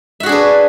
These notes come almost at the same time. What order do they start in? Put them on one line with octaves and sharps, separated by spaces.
E5 F#4 G#4 D4 B4